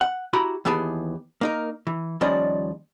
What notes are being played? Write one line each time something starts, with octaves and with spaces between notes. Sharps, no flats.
F#5
E4 F#4 G4 A#5 B5
D#2 E3 B3 G4 G#4 A5
A#3 D#4 A#4
E3
D#2 F3 G3 C#4 D5 D#5